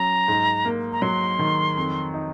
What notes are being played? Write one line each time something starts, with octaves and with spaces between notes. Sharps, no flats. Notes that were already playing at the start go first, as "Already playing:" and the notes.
Already playing: F#3 C#4 A#5
G#2
A#3
A#5
F#3 C6
D#3
F2
D#4